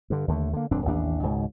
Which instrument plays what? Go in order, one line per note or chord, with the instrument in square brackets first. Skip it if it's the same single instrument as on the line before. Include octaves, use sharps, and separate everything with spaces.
[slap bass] G2 D3
D#2 D3 A3
D3 A#3
D#1 F#2 C4 D4
A1 D#2 D4
C#2 G#2 B2